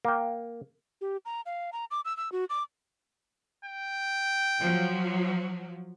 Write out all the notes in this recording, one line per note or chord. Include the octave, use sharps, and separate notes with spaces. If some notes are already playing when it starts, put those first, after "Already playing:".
A#3 G5
G4
A#5
F5
A#5
D6
E6
E6
F#4
D6
G5
F3 F#3